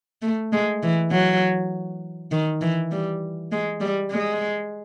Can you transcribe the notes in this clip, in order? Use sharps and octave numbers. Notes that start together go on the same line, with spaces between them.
A3
G#3
E3
F#3
D#3
E3
G3
G#3
G3
G#3